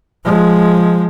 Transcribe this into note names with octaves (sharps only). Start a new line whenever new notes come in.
F3 G#3